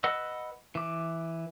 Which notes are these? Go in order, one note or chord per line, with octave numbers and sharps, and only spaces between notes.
B4 D#5 F#5 E6
E3 D6